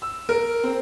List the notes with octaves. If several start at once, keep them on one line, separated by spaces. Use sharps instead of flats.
E6
A#4
C4